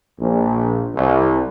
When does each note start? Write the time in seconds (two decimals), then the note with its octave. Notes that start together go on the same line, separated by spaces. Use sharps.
0.19 A#1
0.96 C2